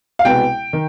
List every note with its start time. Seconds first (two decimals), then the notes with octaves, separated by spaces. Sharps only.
0.19 F5
0.24 C2 B2 G#3 B3 G5
0.73 D#3